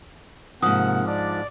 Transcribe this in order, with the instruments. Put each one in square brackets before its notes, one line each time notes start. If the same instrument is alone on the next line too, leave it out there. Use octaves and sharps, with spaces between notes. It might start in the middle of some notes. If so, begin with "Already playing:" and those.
[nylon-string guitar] G#2 F3 [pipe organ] C3 A#3 [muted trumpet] F#5 [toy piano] D#6
[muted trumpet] D4 [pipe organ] D5